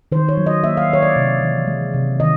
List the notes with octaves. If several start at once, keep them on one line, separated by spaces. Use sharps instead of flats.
D#3 C5
C#5
F#3
D#5
A#3 E5
F5
D#3 C#5
D5
C3
E3
G#3
C3
D#3 D#5